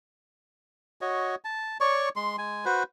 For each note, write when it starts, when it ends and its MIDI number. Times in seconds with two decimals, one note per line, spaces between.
1.01 1.35 66
1.01 1.35 73
1.01 1.35 75
1.44 1.78 81
1.80 2.09 73
1.80 2.09 74
1.80 2.09 85
2.16 2.36 56
2.16 2.36 84
2.38 2.65 56
2.38 2.65 80
2.65 2.83 66
2.65 2.83 71
2.65 2.83 72